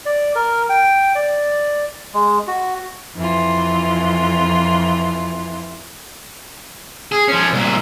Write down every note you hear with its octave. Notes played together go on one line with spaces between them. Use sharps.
D5
A#4
G5
D5
G#3
F#4
F2 E3 F4
G#4
F3 C#4
C2 A#2